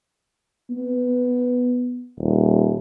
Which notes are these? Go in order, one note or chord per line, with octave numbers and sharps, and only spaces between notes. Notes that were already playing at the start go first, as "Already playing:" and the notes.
B3
D#1